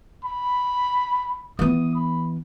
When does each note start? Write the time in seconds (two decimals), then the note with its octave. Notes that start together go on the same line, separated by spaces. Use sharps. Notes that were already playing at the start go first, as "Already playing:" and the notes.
0.24 B5
1.59 E3 B3 D#6
1.95 B5